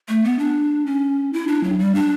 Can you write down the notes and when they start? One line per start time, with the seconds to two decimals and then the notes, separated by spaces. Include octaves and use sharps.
0.08 A3
0.24 B3
0.39 D4
0.86 C#4
1.33 E4
1.47 D4
1.64 F#3
1.79 G3
1.95 D4